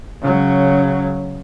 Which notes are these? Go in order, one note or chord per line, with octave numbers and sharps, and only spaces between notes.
C#3 F#3